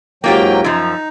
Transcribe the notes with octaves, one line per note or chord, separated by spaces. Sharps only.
G#2 F#3 A#3 F4 G4 G5
F#2 F3 D#4